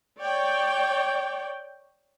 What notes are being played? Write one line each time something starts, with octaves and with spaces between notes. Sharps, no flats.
C#5 D5 G5